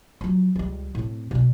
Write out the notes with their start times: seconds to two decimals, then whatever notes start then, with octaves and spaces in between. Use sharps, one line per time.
0.21 F3 F#3
0.56 C#2 G3
0.95 A2 C4
1.31 B2 D4